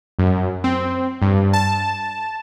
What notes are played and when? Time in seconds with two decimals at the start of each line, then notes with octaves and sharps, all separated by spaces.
0.19 F#2
0.64 C4
1.22 G2
1.53 A5